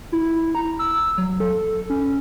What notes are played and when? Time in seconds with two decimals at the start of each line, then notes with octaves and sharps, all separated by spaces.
0.12 E4
0.55 A#5
0.79 E6
1.18 F#3
1.40 A4
1.90 C#4